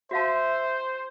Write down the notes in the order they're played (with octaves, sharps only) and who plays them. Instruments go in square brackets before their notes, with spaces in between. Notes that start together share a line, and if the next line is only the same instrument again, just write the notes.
[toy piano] F#4 F5 A5 [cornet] C5 [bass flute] E5